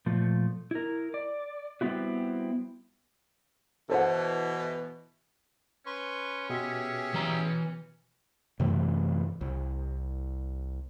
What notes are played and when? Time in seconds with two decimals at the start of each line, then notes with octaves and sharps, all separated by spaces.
0.06 A#2 F3 A3
0.71 E4 A#4
1.14 D5
1.81 G3 B3 C4 E4 F#4
3.90 B2 E3 A4 C5 F#5
5.86 C#4 B4 C6 C#6
6.50 B2 G4 G#4 E5
7.14 E3 A#5
8.60 F#2 C3 E3 A3
9.41 C2